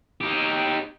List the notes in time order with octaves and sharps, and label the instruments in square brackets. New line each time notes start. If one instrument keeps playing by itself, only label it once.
[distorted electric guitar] D#4 G4